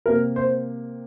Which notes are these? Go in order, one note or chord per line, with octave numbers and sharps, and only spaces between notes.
C3 A#3 A#4
C5